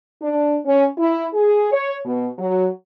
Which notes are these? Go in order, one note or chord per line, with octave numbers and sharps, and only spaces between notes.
D4
C#4
E4
G#4
C#5
B2
F#3